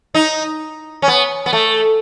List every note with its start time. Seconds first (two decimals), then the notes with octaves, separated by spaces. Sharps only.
0.15 D#4
1.02 C#4
1.08 B3
1.46 B3
1.53 A3